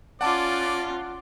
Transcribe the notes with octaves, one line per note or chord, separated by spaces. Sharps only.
C#4 F4 D5 F#5 A5 D6